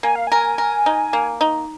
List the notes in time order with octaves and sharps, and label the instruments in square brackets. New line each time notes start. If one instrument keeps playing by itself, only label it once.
[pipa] A#3 [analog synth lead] G#5
[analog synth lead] F5
[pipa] A#4 [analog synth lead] G#5
[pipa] A#4
D#4
A#3
D#4